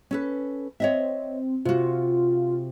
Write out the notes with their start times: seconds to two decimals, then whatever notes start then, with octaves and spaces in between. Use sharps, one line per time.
0.11 C#4 A4 B4
0.80 C4 C#5 D#5 E5
1.65 C3 F4 F#4